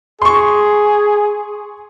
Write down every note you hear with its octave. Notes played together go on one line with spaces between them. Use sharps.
G#4 C6 C#6